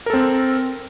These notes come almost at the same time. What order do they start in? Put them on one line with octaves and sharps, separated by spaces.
A#4 A4 C4